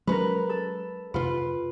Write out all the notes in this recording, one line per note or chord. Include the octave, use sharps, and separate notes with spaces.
F#3 G#3 C#4 A#4 B4
A4
F2 C3 F4 B4